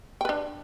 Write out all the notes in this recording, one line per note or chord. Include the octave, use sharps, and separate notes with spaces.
D4 B4 G5